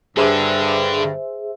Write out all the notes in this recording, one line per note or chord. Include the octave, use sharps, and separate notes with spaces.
G2 D3 G#4 C5 E5